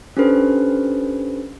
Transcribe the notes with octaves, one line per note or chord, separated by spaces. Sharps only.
C#4 D4 G4 A4 B4 C5